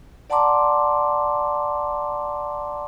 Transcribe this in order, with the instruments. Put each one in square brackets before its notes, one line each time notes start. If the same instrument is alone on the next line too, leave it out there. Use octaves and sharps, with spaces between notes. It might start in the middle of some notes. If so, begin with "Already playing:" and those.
[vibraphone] D5 F#5 A5 A#5 C6 D6